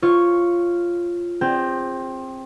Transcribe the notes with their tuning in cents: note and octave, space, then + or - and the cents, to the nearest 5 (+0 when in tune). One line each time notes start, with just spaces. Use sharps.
F4 -5 C#5 -25 C#6 +0
C4 +20 G#4 -25 G5 +0